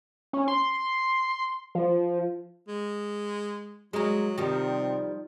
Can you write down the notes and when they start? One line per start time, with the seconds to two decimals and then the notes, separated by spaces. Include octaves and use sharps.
0.33 C#4
0.48 C6
1.75 F3
2.68 G#3
3.93 F#3 G#3 A#4
4.38 C3 D#3 F3 G3